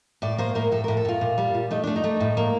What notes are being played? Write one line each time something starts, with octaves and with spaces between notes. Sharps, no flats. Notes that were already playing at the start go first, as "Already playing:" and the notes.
A2 D5
A#3 C5
A2 A#4
A2 A4
A#4
A2
A4
A2 F4
A#2
G3
A#2
A3 D#4
A3 D4
D#4
A3
A2
A#3